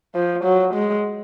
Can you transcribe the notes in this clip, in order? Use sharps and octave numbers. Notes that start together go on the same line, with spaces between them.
F3
F#3
G#3